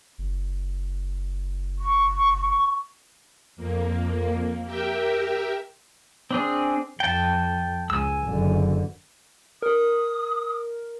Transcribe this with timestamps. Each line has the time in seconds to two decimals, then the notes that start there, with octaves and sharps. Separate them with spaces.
0.18 F#1
1.79 C#6
3.56 F2 A#3
4.64 G4 A#4 E5 G5
6.31 C4 D4 G#4
7.00 F2 G5 A5
7.90 C#2 G#5 E6
8.25 F#1 D3
9.62 A#4 D#6